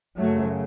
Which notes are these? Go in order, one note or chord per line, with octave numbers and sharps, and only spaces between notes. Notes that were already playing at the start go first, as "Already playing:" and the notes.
F#2 C#3 F#3 A3